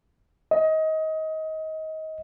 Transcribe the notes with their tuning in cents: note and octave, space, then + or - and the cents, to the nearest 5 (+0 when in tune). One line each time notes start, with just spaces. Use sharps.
D#5 +25